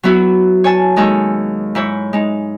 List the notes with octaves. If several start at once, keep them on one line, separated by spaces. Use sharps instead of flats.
F#3 B3 E4 F#4
C#5 G#5 A5
D#2 G#3 D#4 G#4 A4 C#6
G#2 E4 C#5
G#3 D#4